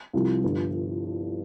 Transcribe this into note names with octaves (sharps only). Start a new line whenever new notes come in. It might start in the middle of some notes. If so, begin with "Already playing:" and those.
C2 C3 F3
G1 G2 D3 F3